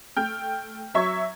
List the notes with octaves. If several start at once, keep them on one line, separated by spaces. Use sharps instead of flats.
A3 G5 F6 G6
F#3 E5 C#6 G#6